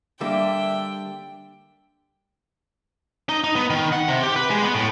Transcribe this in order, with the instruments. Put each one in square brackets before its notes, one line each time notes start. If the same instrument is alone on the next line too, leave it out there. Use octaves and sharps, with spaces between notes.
[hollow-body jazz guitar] D3 G3 A#3 [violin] D4 G5 [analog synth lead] E5
[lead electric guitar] D#4
D#4
B3
D#3
F#5
C3
G4
B4
G#3
B3
A2